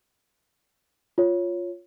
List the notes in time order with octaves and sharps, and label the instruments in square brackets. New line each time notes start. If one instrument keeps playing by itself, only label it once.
[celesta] F4 C#5